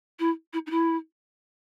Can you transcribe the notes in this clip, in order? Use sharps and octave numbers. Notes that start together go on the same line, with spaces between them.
E4
E4
D#4
E4